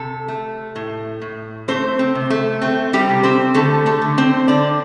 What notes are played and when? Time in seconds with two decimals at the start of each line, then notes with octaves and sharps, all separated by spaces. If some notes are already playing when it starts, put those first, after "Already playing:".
Already playing: C3 A4
0.28 A3
0.76 A2
1.22 A2
1.68 A3 C4 C5
1.99 C4
2.15 C3
2.30 A3
2.62 A3 C4
2.93 G3 G4
3.09 C3
3.23 C4 C5
3.54 D3 A3 A4
3.86 A3 A4
4.02 D3
4.18 C4 C5
4.48 D3 D4 D5